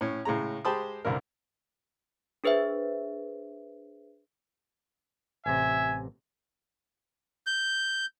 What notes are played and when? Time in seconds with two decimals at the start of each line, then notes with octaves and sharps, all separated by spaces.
0.01 A2 C#4
0.25 A2 C#3 G#3 A#5
0.65 G#3 G4 C5 A5 B5 D#6
1.05 C2 G2 D3 A#4
2.44 D4 G#4 B4 C5 E5
5.46 A1 C3 E5 G#5
7.47 G6